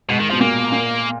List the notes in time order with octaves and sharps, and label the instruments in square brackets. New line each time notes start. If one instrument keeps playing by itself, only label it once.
[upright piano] G#2 [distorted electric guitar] B2
[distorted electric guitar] D#3
[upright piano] B2 [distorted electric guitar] F3
[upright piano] A#2 [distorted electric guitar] A#3
[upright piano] A#2